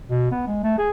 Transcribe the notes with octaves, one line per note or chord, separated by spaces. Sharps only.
B2
B3
G#3
A3
G#4